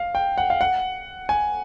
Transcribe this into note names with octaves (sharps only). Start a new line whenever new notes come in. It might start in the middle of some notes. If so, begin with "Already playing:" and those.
Already playing: F5
G5
F#5
F5
F#5
G#5